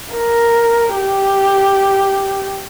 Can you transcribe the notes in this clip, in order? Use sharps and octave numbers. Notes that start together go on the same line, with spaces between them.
A#4
G4